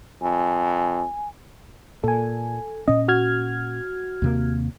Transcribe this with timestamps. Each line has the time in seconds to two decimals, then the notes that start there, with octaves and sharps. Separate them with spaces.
0.22 F2 G#5
2.04 A#2 A4 G#5
2.88 A#2 C#4 D#5
3.08 F#4 F6 G#6
4.22 D#2 C3 A#3